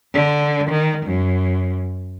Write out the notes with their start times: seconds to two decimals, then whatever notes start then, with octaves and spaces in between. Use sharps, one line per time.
0.14 D3
0.70 D#3
1.05 F#2